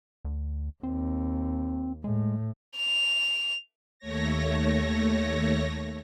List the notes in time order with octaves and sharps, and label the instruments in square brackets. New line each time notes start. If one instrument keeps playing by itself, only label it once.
[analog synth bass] D2
[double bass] D#2 [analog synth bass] C4
[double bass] A2 [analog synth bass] G#3
[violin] F7
[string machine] D#2 A3 C#5 A#6